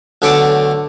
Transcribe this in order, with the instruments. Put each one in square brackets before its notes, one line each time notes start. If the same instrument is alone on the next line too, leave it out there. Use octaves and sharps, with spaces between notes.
[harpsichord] B1 D3 A3 C#5 A5 D6